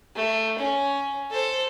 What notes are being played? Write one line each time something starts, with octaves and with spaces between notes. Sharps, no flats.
A3
C#4
A4 C5